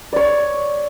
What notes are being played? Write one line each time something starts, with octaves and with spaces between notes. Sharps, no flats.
C#5 D5